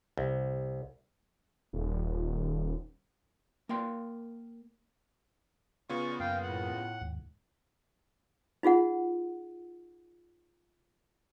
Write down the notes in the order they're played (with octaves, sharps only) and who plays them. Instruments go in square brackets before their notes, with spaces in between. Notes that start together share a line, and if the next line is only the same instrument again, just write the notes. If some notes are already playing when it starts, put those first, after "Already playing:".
[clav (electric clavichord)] C2
[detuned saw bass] D#1
[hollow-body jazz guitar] A#3 A#4 G5 C6
[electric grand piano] C#3 B3 F4 [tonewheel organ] D5 F5 G#5 [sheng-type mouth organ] C#6
[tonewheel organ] F#2 A#3 [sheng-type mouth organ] F5 G5
[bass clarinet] A2 [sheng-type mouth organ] F#5
[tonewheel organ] D#2 G#2
[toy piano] D#4 F4 G#4 F#5